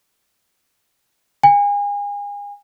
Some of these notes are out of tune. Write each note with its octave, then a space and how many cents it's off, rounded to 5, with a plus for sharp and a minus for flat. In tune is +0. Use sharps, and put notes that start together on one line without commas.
G#5 -35